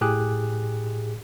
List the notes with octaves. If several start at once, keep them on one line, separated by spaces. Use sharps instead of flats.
A2 G4 G#4 F#6